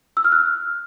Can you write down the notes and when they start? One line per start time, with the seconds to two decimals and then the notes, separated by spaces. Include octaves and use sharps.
0.17 E6
0.24 F6
0.32 F#6